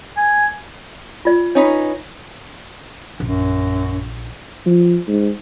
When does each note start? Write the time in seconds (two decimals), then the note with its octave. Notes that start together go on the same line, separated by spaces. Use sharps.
0.17 G#5
1.25 F4 D5
1.55 C#4 D#4 B4 C#5
3.20 A#1 F#2
4.66 F3
5.08 G#2